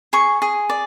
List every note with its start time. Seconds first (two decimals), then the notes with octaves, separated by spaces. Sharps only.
0.13 G#4 C#6
0.42 G#4
0.70 D5